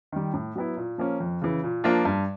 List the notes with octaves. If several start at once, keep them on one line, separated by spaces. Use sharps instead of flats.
D#3 G3
A2
F#3 B3 E4
A#2
F3 A#3 C#4
F2
C#3 E3
A#2
F3 A#3 D4 F4
G2